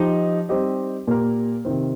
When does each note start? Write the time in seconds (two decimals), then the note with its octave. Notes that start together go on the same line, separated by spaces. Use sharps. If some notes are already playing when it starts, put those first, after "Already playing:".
Already playing: F3 D#4 G4 D#5
0.49 G3 C4 D#4 G4 D#5
1.07 A#2 A#3 G4 A#4
1.65 C3 D#3 C4